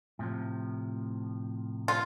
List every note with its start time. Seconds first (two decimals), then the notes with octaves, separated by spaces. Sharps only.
0.19 A2 C3 F3
1.88 F4